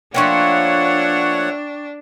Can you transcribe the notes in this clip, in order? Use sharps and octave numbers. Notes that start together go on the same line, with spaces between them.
F3 A3 A#3 D4 C#5 F#5 G5 C#6